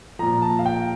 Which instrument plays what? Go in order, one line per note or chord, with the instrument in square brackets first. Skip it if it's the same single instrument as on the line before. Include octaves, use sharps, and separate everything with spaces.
[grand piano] A#2 F3 A#5
A5
F5
G5